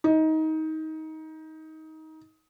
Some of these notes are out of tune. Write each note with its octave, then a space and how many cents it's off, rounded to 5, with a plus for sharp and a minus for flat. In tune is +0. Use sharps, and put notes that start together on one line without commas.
D#4 +20